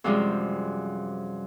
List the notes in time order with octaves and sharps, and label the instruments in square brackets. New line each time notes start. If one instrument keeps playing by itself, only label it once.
[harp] F#2 C3 F3 G3 G#3 F4